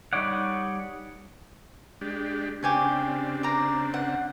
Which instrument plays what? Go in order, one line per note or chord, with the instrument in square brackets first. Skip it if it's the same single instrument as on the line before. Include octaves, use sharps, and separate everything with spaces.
[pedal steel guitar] G3 D#4 C#5 D5 F#5
[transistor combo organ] G#3 D4 G4
[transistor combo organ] C#3 C4 D4 [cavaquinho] G4 G#5 C#6
[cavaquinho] D5 A#5
F#5